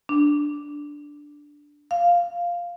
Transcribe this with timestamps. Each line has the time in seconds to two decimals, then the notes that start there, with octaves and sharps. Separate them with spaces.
0.09 D4
1.91 F5